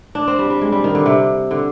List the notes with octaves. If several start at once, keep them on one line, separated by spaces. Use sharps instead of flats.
D4
C4
G3
G3
G#3
G3
D#3
D3
C3
D3